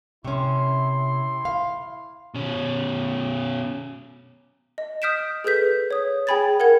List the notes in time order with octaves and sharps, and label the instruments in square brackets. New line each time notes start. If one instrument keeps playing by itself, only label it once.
[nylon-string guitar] C3 C#4 [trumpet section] E4 C6
[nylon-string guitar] F5
[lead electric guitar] B2 C#4
[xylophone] D#5
D#6 F6 G6 B6 D7 E7
G#4 A4 B4 G6 B6
C#5 D#6
G#4 G5 G#5 B5 G#6 A6
A#4 F#5 G#6